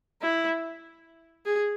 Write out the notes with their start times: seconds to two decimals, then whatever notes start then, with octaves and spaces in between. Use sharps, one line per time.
0.22 E4
1.46 G#4